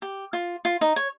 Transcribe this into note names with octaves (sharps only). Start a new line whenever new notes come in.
G4
F4
F4
D#4
C#5